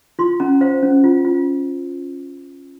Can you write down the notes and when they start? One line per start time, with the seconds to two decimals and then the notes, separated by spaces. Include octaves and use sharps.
0.19 F4 C6
0.40 C#4 A#5
0.61 C5 F5
0.83 C#4
1.04 F4
1.25 F4